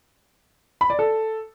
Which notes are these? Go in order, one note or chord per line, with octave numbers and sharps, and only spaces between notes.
B5
D5
A4